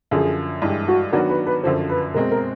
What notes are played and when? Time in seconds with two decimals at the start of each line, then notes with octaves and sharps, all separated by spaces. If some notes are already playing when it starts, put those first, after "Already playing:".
0.11 F#2 D3 F3 G#4
0.62 G2 E3 G#3 G4
0.88 F#4
1.12 D#3 F#3 B3 D4 F#4 A#4
1.29 B4
1.46 B4
1.63 F#2 D3 F3 C5
1.90 B4
2.14 B2 G#3 C4 A#4
2.31 A#4